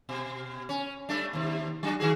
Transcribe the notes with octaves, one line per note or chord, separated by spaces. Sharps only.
B2
C#4
G3 A3 D4
D#2 C3
F#3 D4 F#4
D#3 F#4 G#4